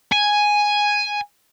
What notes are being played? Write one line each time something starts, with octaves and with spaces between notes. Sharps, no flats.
G#5